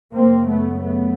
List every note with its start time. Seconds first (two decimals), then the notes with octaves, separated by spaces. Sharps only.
0.14 F#2 C#3 A#3 C4
0.48 A3 B3
0.82 A3 B3